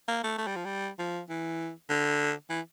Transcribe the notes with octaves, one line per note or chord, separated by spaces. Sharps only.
A#3
A3
A3
G3
F3
G3
F3
E3
D3
E3